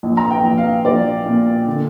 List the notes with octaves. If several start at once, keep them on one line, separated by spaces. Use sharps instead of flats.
A#1
A#5
G5
A#1
F5
A#1 D5
A#2
D3